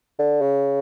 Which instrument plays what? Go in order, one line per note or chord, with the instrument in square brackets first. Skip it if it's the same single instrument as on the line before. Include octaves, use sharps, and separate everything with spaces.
[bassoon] D3
C#3